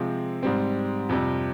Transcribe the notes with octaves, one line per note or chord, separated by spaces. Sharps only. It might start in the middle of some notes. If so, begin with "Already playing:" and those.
Already playing: C3 F3 G#3 C4
G#2 G3 C4
F2 C3 G3